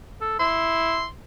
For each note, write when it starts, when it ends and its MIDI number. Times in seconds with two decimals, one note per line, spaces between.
0.21 0.36 69
0.39 1.04 64
0.39 1.05 84